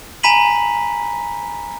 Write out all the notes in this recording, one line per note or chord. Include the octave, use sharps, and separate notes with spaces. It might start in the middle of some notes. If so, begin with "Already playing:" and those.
G#5 A#5 B5 B6 D#7 F#7